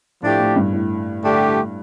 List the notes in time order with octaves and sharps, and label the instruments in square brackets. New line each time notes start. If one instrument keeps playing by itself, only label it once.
[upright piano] A2 [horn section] F3 A3 D4 G4
[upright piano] A2
G2
A2
[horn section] D3 A3 D4 G4